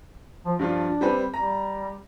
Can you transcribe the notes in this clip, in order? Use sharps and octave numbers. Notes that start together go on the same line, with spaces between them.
F3
G2 F3 D4 F4
G3 C4 B4
G3 A#5